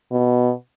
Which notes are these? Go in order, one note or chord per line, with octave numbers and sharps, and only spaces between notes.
B2